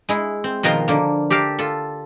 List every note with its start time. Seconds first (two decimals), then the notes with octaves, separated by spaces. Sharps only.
0.09 G#3 E4
0.44 C4
0.63 B2 D#3 F3 A#4 A#5 C6
0.88 D3 A#3
1.30 G4 A4 A#4 F5
1.59 F4 A4